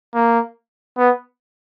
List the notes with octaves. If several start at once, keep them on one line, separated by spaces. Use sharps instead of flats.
A#3
B3